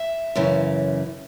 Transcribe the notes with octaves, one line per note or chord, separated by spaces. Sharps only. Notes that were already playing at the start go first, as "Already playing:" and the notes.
Already playing: E5
F#2 C#3 E3